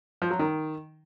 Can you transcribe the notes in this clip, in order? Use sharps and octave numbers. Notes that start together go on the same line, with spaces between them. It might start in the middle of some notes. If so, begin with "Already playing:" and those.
F3
F#3
D#3